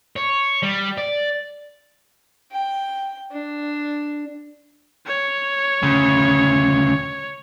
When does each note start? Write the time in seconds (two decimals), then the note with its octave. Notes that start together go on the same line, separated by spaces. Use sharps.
0.16 C#5
0.63 G3
0.98 D5
2.52 G5
3.31 D4
5.07 C#5
5.83 D2 C#3